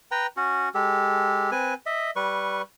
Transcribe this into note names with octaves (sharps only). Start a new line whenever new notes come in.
B4 G5 A#5
C#4 F#4
G#3 G4 A4
C4 B4 G#5
D#5 E5
G3 B4 C#6